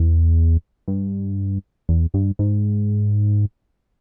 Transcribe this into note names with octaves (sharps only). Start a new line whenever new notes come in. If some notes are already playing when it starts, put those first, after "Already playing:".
Already playing: E2
G2
E2
G2
G#2